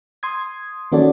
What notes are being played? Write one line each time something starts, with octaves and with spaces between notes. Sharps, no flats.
C6 D#6 G#6
D#3 A#3 C#4 F#4 A4 D5